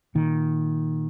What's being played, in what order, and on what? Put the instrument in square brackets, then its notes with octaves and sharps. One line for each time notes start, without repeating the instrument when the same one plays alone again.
[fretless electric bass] A#2 D#3